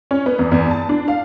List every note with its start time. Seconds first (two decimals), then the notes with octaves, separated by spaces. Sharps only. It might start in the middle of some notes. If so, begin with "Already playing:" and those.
0.11 C#4
0.26 B3
0.39 E2
0.52 E2
0.71 A5
0.89 D4
1.08 F5